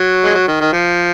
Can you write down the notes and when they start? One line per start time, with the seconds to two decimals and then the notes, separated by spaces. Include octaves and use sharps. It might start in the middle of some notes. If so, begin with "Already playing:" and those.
Already playing: F#3
0.24 G#3
0.34 F#3
0.47 D#3
0.60 D#3
0.73 F3